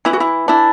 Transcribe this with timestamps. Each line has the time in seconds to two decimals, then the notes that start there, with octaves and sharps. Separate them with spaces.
0.05 E3 E4
0.13 F#4
0.20 E4
0.48 D4 E4